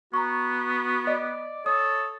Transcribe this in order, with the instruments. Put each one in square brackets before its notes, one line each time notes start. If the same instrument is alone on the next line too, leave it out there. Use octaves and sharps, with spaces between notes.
[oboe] B3 [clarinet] F#4 [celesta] A#5 C#6
[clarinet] D5 [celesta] D#5
[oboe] A4 [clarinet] C#5 [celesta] D#6